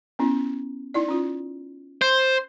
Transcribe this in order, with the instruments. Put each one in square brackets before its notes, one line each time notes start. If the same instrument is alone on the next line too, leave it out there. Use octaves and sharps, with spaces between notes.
[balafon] B3 C#4 E4
D#4 E4 D5
C#4 F4
[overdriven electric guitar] C5